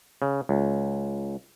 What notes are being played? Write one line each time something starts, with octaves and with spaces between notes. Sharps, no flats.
C#3
C#2